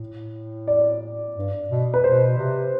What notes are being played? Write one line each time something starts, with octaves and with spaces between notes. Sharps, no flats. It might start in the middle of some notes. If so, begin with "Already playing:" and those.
Already playing: A2
D5
G2
B2
B4
B2 C5
C3